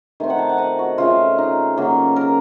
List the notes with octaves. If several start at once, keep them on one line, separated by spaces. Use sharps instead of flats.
D#3 A3 C4
F#5
A5
F#5
D#5
F#4
C#3 A3 C#4 F4
D#4
C#3 F#3 A#3
A#4